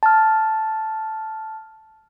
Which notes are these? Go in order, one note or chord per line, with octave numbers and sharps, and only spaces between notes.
A5 F6